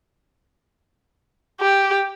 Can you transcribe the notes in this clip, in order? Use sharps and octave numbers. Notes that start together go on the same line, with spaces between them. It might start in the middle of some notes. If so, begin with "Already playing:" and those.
G4